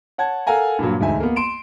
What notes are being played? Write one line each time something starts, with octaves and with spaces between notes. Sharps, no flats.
C#5 F#5 A5 G#6
A4 A#4 F5 F#5 G#5 A#5
G2 A#2 F#3
E1 D2 G#2 E5 G#5
A#3 B3
C6 D7 E7